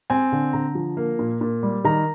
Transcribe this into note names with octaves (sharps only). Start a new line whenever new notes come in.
C4 G#5
D3
D3 A#5
F3
A#3
A#2
A#2
G3
D#3 A#5